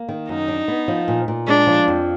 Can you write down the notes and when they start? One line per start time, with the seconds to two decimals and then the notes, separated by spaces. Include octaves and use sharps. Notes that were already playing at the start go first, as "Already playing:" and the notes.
Already playing: A#3
0.09 D#3
0.29 F#2 D#4
0.48 D4
0.68 B3
0.88 F3
1.08 A#2
1.28 A#2
1.47 G#3 D4
1.67 F3
1.88 F2